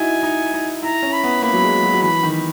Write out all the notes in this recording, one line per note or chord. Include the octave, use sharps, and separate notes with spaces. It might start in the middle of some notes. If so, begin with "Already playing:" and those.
Already playing: D#4 E4 F#4 G#5
D#4
D#4
E4 A#5
C#4
B5
B3
A#3 B5
F#3
G#3
F#3
F#3
E3 B5
D#3